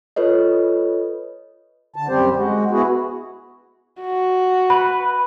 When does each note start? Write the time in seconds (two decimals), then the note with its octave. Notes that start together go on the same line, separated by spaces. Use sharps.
0.16 F4 A4 B4 C#5 D#5
1.96 D3 A5
2.08 F#2 G3 C4 G4 C5
2.36 G#3 F#4
2.71 B3 E4 F#4 G#4
4.01 F#4
4.70 B4 B5